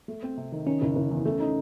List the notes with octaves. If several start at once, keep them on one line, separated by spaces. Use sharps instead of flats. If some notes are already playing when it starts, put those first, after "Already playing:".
A3
C4
C3
D#3
D#3 C#4
F#1
F#1
E2
A3
D#4